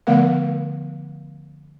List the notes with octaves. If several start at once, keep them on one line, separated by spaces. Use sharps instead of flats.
D3 F3 A3 B3 A#4 F5